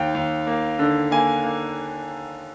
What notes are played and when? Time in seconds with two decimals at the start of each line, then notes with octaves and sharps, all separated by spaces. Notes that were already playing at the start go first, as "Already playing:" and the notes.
Already playing: D#2 G5
0.14 D#2
0.47 A#3
0.79 D3
1.11 A#3 G#5
1.44 A#3